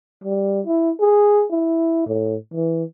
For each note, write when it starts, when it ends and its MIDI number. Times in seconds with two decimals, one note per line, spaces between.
0.24 0.61 55
0.67 0.91 64
1.00 1.46 68
1.52 2.06 64
2.07 2.35 45
2.54 2.84 52